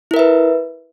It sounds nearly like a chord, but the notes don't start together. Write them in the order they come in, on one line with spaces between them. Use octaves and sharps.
E4 A#4 E5 B4